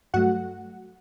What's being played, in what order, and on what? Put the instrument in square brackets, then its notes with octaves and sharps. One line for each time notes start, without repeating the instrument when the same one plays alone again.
[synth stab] G2 F#3 A3 F#4 F#5